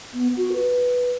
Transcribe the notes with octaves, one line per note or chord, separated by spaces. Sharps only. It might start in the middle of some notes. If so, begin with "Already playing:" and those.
B3
F#4
B4